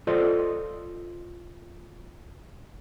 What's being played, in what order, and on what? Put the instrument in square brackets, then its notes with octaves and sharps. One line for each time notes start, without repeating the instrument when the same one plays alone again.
[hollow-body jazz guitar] F4 A4 C5 D5 D#5